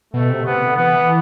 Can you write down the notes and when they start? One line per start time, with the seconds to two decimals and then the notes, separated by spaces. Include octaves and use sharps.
0.14 B2 A3
0.30 C3
0.45 C3 B3
0.61 D3
0.77 E3 B3